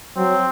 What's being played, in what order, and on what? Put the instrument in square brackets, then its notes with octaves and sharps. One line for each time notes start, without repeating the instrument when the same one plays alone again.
[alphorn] F#3 [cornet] C4